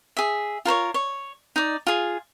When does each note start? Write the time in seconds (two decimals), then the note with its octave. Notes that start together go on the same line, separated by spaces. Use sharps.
0.17 G#4 E5
0.65 F4 A#4 C5 C#5
0.94 C#5
1.56 D#4 D5
1.87 F4 G#4